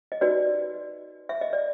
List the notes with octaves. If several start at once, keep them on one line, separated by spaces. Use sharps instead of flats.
D#5
D#4 F#4 B4 D5
E5
D#5
D5